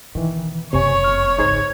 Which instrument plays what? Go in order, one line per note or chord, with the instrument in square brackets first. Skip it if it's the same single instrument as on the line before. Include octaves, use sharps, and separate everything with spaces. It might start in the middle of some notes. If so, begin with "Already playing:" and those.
[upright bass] B2 [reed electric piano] D#3 E3
[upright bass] F#1 F2 [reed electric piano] C3 G#5 [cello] C#5 [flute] C#6
[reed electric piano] F6
[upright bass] G#1 C#2 [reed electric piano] D#4 G#4 C5 [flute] G#6